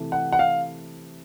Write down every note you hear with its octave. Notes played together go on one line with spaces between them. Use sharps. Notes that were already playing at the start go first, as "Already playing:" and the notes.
Already playing: C3 E3 A3
F#5
F#5
F5